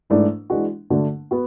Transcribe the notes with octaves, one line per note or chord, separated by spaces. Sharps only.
G#2 E3 A3 D4
E3 G#3 D4 F#4
D3 A3 D4 F#4
B3 F#4